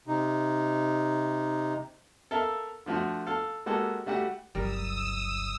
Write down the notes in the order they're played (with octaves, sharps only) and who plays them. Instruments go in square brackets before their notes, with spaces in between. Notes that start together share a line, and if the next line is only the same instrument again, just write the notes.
[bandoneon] C3 D#4
[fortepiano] A4 A#4 E5 F5
D3 F3 A3 F#4
A4 F5
G#3 A#3 F#4 G4 A4
G3 A3 F#4 G4 F#5
[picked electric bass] G1 C#2 F#3 [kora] G3 A#4 [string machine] D#6 E6